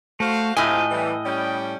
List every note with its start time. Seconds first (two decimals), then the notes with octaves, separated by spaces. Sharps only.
0.20 A3 F#4 C5 F5
0.57 A2 C4 F4 G4 D#5 G#5
0.91 E3 G3
1.25 G3 C#4 G5